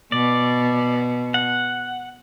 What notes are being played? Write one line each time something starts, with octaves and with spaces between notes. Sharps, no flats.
B2 D5
F#5